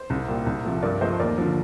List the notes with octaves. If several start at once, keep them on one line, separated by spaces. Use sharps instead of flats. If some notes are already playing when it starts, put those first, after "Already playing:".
Already playing: C5
C2
A#2 G3
C2
C3 F3 A3
G2 A#4 D5
F3 A3 C5 D#5
D#2 A#4 D5
D3 F3